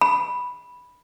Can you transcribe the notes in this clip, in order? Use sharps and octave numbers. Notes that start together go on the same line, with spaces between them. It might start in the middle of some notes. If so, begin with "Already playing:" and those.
B5